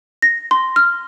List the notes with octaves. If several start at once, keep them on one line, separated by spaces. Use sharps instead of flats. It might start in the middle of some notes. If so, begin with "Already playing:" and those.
A#6
C6
F6